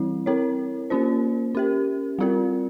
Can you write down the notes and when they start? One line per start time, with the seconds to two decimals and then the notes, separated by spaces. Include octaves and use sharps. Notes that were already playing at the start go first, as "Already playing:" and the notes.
Already playing: E3 G3 C4 E4
0.26 C4 E4 A#4 C#5
0.90 A#3 C#4 F4 C5
1.55 C#4 G4 A#4
2.19 G3 C4 F4 A#4